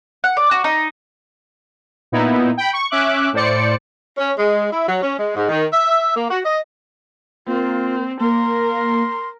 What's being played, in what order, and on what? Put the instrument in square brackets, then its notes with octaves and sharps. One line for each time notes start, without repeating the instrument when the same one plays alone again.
[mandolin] F#5
D5
F#4
D#4
[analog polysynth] A#2 B3 D#4 E4
G5 B5
C#6
C#4 E5 D6 F#6
A2 C5 D5 C#7
[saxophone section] C#4
G#3
E4
F#3
C#4
G#3
G#2
D#3
E5
A#3
F#4
D#5
[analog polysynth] A#3 [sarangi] C4 [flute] F4
[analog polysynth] A#3 [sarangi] A#4 [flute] C6